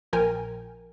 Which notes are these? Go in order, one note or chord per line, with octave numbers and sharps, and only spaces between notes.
A#1 F3 A#4 G5 G#5